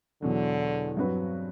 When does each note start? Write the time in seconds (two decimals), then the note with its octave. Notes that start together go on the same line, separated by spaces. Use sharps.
0.22 E2 B2 D3 F#3
0.97 G2 F#3 C4 F#4 B4